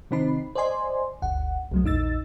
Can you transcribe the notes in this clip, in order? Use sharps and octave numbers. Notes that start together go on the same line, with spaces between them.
C3 D#3 C4 D#4 B5 C7
C5 D5 D#5 G#5 C6
G1 D2 F#5
C2 F#3 A3
A#1 E2 D#4 E6 A6